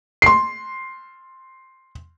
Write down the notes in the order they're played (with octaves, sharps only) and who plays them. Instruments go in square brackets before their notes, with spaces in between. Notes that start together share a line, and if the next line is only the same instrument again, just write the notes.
[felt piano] C6 C7